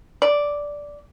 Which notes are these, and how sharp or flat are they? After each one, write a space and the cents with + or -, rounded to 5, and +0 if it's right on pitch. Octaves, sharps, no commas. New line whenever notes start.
D5 -5